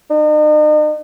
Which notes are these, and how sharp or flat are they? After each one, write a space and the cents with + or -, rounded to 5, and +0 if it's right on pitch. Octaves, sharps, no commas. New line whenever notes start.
D#4 -40